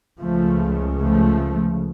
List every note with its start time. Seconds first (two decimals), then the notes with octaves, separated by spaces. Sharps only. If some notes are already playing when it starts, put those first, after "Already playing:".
0.21 C#2 C#3 F3 A3
1.01 F3 A3